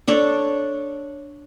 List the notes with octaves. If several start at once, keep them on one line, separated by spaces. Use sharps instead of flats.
D4 A4 C#5